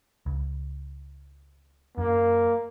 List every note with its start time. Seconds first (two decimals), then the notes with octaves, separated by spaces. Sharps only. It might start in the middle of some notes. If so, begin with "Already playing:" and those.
0.26 C#2
1.98 F#2 A#3